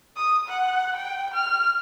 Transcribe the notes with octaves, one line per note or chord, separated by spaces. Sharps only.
D#6
F#5
G5
F6